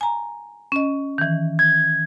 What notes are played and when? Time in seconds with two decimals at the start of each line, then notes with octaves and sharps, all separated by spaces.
0.01 G#5 A#5
0.72 C#4 D#5
1.18 D#3 E3
1.59 G#6